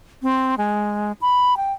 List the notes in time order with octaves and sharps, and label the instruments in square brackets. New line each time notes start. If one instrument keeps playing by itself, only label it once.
[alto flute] C4
G#3
B5
G5